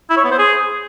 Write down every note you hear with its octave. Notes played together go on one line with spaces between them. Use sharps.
E4
C#5
B3
C5
G#4